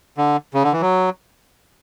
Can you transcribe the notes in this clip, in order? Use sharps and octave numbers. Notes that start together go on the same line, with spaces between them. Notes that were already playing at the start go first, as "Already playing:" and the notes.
D3
C#3
D3
E3
F#3